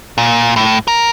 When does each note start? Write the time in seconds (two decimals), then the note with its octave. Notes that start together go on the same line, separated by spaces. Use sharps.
0.18 A#2
0.56 A2
0.88 A#4